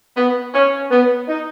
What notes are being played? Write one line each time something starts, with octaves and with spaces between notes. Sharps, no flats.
B3
C#4
B3
D#4